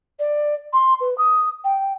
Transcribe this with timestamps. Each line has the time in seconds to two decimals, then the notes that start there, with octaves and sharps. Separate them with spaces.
0.19 D5
0.73 C6
1.00 B4
1.18 D#6
1.64 G5